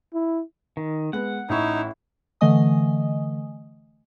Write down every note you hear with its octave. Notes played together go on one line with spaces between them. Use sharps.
E4
D#3
G#3 B3 F#5
A1 D#4 E4 C#6
D3 E3 A3 D#5 G#5 D#6